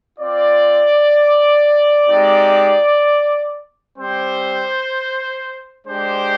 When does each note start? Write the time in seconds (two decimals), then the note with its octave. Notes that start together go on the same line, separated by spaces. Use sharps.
0.18 C4 F4 D5
2.07 G#3 C4 D#4 G4
3.96 G3 C4 G4 C5
5.86 G#3 D4 G4 C5